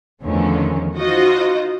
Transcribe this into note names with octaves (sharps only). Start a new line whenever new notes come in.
E2 D3 D#3 F3 A3 C#4
D#4 F4 F#4 C5 D#5